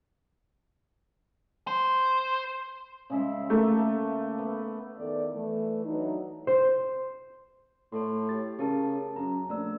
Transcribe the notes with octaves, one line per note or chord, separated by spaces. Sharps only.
C5
C#3 G#3 E5
A3 A#3
B3
E2 D#3 E3 A4 D5
E3 A3
E3 F#3 D4 D#4
C5
A2 C#5 C6
G4 A6
C#3 G#4 A#4 A5
F#2 A#5
A#1 A3 D5 E6